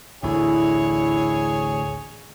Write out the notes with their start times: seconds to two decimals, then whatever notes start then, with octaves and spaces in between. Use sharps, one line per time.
0.23 A1 D2 E4 G#4 C#5